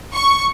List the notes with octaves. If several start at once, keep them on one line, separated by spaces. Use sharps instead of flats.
C#6